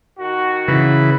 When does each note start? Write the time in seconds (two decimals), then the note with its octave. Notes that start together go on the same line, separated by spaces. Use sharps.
0.19 D#3 F#4
0.68 C#3 E3 B4